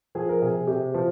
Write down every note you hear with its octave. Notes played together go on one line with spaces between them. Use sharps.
F3 G#4
A#4
C3 G#4
C3 G4
F3